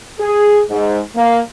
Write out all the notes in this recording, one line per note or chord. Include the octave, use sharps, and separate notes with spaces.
G#4
G#2
A#3